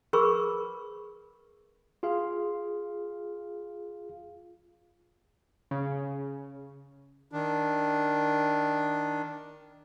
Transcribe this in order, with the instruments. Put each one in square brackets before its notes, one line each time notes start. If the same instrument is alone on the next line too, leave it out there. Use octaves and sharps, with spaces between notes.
[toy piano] G#4 A#4 B4 B5 C#6 E6
[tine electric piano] F4 G#4 F5
[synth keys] C#3
[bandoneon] D#3 D4